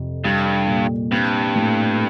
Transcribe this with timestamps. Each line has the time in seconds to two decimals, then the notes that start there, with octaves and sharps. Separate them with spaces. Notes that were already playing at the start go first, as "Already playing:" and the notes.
Already playing: F2 C3
0.24 G2 G3
0.67 A#2
1.11 G2 C4
1.55 A2